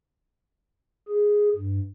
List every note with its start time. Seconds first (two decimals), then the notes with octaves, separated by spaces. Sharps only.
1.08 G#4
1.55 G2